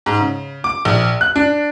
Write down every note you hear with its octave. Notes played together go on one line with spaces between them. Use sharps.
G#2
C#3
D6
A#1
F#6
D4